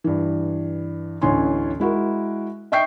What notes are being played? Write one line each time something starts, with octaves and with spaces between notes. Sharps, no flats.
G2 E3
A1 D2 E3 C#4 G#5 C6
G#3 E4 F#4 A#4
D#5 E5 G5 C#6 G6 C7